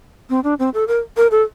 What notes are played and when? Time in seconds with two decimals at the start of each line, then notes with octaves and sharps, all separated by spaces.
0.30 C4
0.44 D4
0.59 C4
0.74 A4
0.88 A#4
1.17 A#4
1.31 A4